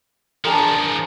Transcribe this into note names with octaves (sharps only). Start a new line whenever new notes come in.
E3 F3 D4 G#4 A#4